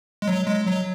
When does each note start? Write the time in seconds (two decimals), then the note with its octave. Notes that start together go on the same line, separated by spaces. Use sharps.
0.22 G#3
0.28 F#3
0.47 G#3
0.66 F#3